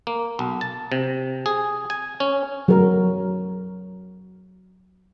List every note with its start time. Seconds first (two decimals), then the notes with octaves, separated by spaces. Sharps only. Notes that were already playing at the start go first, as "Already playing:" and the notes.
0.07 A#3
0.39 B1
0.61 A5
0.92 C3
1.46 G#4
1.90 G#5
2.20 C#4
2.68 F#3 A#4